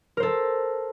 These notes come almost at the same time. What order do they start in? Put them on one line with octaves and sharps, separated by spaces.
A#4 C5 A4